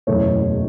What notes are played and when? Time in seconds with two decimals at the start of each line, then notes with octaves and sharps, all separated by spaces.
0.07 F#1 E2 B2 A3 C#5